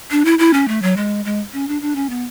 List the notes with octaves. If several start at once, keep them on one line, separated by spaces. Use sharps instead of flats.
D4
E4
E4
C#4
A3
F#3
G#3
G#3
C#4
D4
D4
C#4
B3